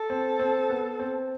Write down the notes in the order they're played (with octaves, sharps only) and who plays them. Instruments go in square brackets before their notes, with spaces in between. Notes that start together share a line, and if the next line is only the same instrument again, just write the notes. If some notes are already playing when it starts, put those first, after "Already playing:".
Already playing: [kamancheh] A4
[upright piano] C4
C4
B3
C4